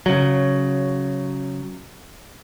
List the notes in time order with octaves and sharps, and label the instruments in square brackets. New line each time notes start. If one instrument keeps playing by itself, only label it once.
[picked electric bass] C#3 F#3